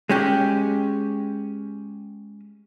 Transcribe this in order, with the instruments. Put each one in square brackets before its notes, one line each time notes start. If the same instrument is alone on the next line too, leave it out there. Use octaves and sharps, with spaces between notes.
[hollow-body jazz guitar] G#3 C#4 G4